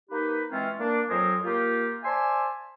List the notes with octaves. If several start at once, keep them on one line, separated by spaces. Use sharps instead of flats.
A#3 D#4 G4 B4
E3 G#3 C4 C#4 F4
A#3 D4
F2 F#3 A#4 C5 G#5 D#6
A#3 F4 G4
C5 D5 E5 G#5 A5 C6